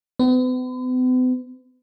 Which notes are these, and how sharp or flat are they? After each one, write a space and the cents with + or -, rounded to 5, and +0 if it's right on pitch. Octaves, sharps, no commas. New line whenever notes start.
B3 +45